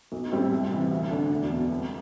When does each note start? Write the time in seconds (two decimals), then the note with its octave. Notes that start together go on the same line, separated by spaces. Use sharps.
0.12 B1
0.32 A2 G3 C4 E4
0.52 C2
0.72 C3 E3
0.91 D2
1.11 D3 A3 D4
1.30 E1
1.50 E2 B2
1.70 C2